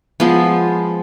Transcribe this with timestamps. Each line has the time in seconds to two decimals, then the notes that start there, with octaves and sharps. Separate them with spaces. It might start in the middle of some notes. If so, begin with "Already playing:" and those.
0.20 F3 G#3 B3